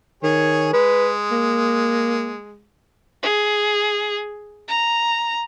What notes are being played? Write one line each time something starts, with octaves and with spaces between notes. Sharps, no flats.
D#3 G#4 C#5
G#3 B4
A#3
G#4
A#5